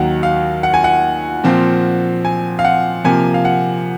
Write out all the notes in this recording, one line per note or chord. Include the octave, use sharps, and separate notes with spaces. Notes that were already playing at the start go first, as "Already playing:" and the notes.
Already playing: D#2 D#3 F#3 F#5
F5
F#5
G#5
F#5
A#2 F3 C4
G#5
F5
F#5
C3 F3 A#3 G#5
F5
F#5